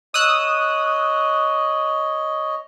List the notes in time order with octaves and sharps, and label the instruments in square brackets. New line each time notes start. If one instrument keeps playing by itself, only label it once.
[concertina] C#5 D#5 [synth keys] D#6 E6 F#6